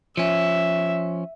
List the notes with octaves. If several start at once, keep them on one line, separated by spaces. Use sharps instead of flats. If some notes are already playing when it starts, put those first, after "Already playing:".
F3 C#4 E5